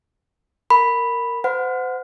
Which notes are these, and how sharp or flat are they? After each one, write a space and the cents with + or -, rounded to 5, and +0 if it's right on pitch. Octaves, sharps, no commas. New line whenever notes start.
A#4 -10 B5 +0
C5 -35 F#5 -15